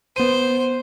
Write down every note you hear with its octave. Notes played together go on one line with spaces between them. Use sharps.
B3 C5 D#7